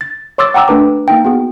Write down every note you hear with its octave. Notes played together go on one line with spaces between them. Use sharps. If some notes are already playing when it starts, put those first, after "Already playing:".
A6
C#5 C6 D6 E6 A6
F#5 G5 A#5 D6 E6
A3 D4 B4 D6
A#3 D#4 G5
B3 F#4 G#4